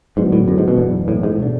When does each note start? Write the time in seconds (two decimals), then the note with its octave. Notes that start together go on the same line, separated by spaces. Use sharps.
0.17 G#2 D3 F#3 B3 D4
0.32 A2
0.48 F#2
0.58 G#2
0.68 B2
0.78 F#2 E3 B3 D4
1.08 A2
1.23 G#2
1.38 B2 A3 D4